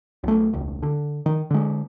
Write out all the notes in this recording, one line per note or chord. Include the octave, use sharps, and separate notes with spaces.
B1 A3
E1 C#2
D3
D#3
D3 G#3